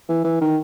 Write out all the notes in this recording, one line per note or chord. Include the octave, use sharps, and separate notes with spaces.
E3
E3
D#3